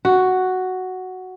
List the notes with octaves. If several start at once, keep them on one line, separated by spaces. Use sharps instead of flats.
F#4